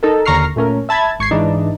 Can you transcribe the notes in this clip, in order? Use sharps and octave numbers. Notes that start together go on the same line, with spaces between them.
D#4 A4 A#4
D#2 D3 A#5 C#6 F6 C7
A#2 A3 C#4 A#4
E5 A5 B5 G#6
G#1 C#6 G#6 C7
G#2 E3 D4 D#4